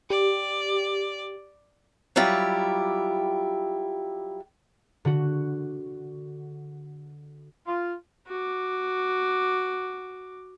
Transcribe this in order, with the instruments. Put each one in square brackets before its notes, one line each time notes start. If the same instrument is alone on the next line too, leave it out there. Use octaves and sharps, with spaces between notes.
[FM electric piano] G4 [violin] D5
[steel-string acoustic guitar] F#3 G3 E4 F4 G4
[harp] D3 F#4
[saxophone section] F4
[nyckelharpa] F#4 D6